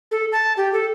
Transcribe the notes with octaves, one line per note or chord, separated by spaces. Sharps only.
A4
A5
G4
A4